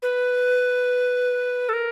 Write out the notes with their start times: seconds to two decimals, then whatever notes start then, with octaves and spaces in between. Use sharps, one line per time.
0.02 B4
1.69 A4
1.73 A#4